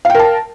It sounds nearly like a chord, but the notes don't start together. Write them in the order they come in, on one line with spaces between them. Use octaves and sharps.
F5 G5 A#4 A5